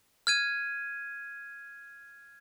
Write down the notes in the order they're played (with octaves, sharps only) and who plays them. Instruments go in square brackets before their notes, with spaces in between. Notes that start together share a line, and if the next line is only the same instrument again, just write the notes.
[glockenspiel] F6 G#6 D#7